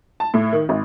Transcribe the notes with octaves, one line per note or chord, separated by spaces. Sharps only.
A5
A2
D#3
G#1